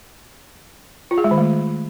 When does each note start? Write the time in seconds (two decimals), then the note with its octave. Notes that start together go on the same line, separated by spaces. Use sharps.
1.11 F4
1.18 G#4
1.24 G#3
1.31 D#3
1.38 A3